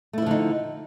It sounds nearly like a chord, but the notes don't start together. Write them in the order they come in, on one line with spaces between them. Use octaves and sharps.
A3 E4 F3 D3 D#4